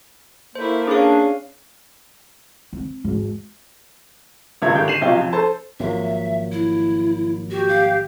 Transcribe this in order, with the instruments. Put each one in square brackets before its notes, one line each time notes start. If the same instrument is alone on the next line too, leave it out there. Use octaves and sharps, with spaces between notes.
[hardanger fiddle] A3 E4 [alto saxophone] A#3 [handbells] C5
[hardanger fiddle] C#4 [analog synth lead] D4 [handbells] G#4 F5
[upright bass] C4
G#1 E2
[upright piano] G#1 C#2 G2 E5 G#6
G#1 D3 G4 G5 G6
C7 D#7 E7 F#7
B1 C3 F4 G4 G7
F2
A4 C5 A5
[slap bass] G#1 [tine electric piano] F3 F#3 A#3 [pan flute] E5
[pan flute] E4
[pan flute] F#4 [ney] G4
[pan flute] F5